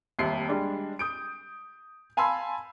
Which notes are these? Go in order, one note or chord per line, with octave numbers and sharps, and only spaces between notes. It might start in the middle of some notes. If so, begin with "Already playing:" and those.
F1 D#2 G3 E5 C7
G3 G#3 D4
D#6 G6 D7
F5 G#5 A5 B5 C6 E6